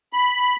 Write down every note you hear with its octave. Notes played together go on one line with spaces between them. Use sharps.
B5